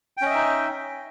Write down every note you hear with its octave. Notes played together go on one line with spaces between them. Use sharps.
C#4 D#4 D#5 E5 G5